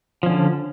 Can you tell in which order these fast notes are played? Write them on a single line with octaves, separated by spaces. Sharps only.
F3 C#4 D3